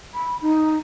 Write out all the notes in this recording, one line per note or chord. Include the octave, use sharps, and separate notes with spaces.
B5
D#4